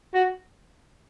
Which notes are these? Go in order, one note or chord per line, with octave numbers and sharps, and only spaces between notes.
F#4